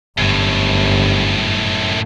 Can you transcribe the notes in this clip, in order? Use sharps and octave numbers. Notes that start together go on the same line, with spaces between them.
G1 F#2 A2